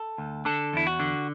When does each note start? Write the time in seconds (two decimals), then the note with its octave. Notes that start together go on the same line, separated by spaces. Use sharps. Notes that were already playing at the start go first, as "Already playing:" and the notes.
Already playing: A4
0.18 D2
0.45 D3 A4
0.73 E2 E4
0.87 F#4
1.00 D3